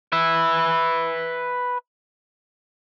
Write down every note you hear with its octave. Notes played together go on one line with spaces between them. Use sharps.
B4 E5